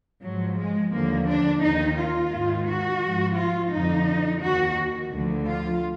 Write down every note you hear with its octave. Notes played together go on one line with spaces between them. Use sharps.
G#2 F3 F#3
G#3
D#2 D3 F3 A#3
D4
D#2 D#3 D#4
F4
G#2 D#3
F#4
G#2 F3
F4
F2 D3 F3 D#4
D#2 D#3 F#4
D2 D3 F3
F4